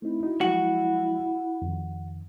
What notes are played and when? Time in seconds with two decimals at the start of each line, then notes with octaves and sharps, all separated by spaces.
0.02 A3 C4 D#4 E4
0.23 D#4 F#4
0.41 F3 F#3 G#3 F#4
1.62 F2 D#3